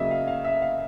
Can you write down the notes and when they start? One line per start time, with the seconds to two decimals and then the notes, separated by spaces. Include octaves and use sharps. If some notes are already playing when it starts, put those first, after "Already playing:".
Already playing: C#3 F#3 A#3 D#5 E5
0.11 F5
0.28 F5
0.45 E5
0.62 F5